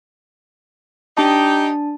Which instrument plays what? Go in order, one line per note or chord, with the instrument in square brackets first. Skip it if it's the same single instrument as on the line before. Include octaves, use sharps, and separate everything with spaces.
[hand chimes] D4 A5 [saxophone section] D#4 G4